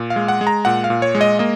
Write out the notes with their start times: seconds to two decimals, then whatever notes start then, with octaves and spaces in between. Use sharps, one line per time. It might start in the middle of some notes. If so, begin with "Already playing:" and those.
Already playing: A#2
0.10 F5
0.16 G#3
0.28 F#5
0.41 G#3
0.47 A#5
0.65 A#2 F#5
0.84 F5
0.90 A#2
1.02 C#5
1.15 G#3
1.21 D#5
1.39 A#3 D#5